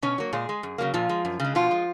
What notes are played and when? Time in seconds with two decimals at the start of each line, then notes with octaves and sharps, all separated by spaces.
0.02 B2 C#4 C#5
0.18 F#3 A#3
0.33 A#2 G#3 G#4
0.49 G#3
0.63 F#2
0.78 C#3 F#3 A#3
0.94 A#2 F3 F4
1.09 G#3
1.25 F#2
1.40 C#3 G#3
1.55 B2 F3 F4
1.71 G#3